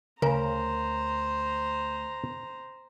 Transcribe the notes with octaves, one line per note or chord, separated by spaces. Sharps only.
D2 C#3 A#4 C5 A#5